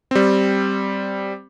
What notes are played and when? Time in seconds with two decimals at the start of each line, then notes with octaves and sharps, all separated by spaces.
0.11 G3 C4